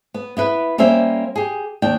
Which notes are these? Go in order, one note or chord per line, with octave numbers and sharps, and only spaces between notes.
B3
B3 E4 B4
G3 A#3 C#4 C5 E5
G4 G#4
D#2 D4 G5